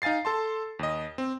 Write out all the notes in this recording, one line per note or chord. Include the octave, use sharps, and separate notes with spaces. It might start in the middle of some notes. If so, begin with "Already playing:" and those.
D#4 F5 G#5 A6 C7
A4 A5 C6
D#2 D#5
C4